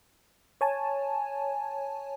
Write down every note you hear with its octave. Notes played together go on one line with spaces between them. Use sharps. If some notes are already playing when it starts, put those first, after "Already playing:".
C#5 G#5 A5